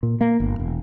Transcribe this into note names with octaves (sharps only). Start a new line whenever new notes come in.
A#2
A#3
G1
E1